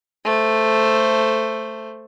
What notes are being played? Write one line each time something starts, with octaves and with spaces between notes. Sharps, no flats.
A3 C5